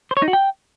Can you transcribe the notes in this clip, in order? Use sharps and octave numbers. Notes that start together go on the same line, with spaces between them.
C5
C#5
D#4
F#4
G5